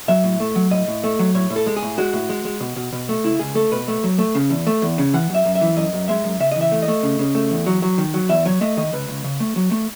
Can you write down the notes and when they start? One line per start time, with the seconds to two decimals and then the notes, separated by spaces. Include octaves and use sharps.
0.08 F#3 E5
0.24 A2
0.40 A3
0.56 F#3
0.71 A2 D#5
0.88 A2
1.04 A3
1.19 F#3
1.34 A2 C#5
1.50 A2
1.56 A4
1.67 G#3
1.76 G#4
1.82 A2
1.98 G#3 F#4
2.13 A2
2.29 G#3
2.45 G#3
2.60 B2
2.76 B2
2.93 B2
3.09 A3
3.24 C#2 E4
3.39 C#2 G#4
3.55 A3 A4
3.72 B2 B4
3.88 A3
4.04 F#3
4.18 A3
4.35 C#3
4.50 E2
4.67 A3
4.82 E2
4.98 C#3
5.13 E3 F#5
5.30 F#2 E5
5.45 F#2
5.55 E5
5.61 E3
5.77 F#2 D#5
5.93 F#2
6.08 G#3 E5
6.24 F#2
6.40 C#3 E5
6.51 D#5
6.56 E3
6.61 E5
6.72 A3
6.82 D#5
6.88 A3
7.03 C#3
7.19 C#3
7.35 A3
7.51 E2
7.66 F#3
7.82 F#3
7.98 D#3
8.14 F#3
8.29 E2 E5
8.45 F#3 C#5
8.61 A3 D#5
8.77 D#3 D#5
8.93 C#2 B4
9.08 C#2
9.24 C#3
9.40 A3
9.56 F#3
9.71 A3